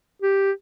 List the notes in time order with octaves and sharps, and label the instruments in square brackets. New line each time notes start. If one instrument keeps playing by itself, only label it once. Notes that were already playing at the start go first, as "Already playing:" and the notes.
[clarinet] G4